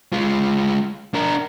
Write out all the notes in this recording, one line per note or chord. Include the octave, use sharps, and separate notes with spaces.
G#3 F4
D4 A#4